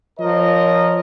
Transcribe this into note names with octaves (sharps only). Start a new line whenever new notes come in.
F3 A#4 C#5 D#5